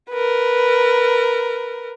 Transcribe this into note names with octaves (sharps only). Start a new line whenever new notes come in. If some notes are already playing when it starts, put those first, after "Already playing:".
A#4 B4